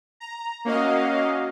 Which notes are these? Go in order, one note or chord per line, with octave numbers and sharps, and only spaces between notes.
A#5
A#3 C#4 F#4 D#5 F5